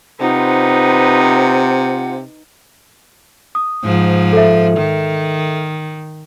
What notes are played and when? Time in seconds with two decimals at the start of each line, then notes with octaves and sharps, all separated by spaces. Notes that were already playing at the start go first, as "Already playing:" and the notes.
0.20 C3 D#4 F4 B4 C5 F#5
3.55 D#6
3.84 G#2 F3
4.33 A4 E5
4.77 D#3